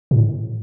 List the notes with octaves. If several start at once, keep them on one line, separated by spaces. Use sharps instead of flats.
A2